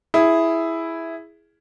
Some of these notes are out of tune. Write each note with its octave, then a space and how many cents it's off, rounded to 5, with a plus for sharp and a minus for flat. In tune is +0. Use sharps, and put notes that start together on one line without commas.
E4 +0 G#4 +0